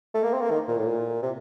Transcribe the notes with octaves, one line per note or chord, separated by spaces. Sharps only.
A3
A#3
C4
A#3
D#3
A#2
A2
A#2
C3